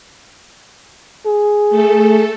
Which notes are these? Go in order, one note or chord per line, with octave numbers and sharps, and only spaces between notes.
G#4
A3 A4